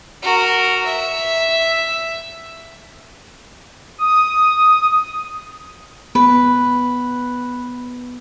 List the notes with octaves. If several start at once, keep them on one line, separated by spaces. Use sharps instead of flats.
F#4 A#4
E5
D#6
B3 B4